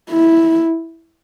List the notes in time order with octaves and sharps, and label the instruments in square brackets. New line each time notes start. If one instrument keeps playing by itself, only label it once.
[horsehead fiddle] E4